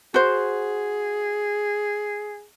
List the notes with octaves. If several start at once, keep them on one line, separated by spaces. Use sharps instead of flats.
F#4 G#4 C5